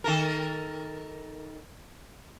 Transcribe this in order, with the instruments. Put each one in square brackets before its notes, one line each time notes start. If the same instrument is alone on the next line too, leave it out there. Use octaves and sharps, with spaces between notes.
[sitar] D#3 A4 A#4